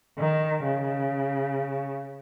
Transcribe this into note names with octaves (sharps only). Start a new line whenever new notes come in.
D#3
C#3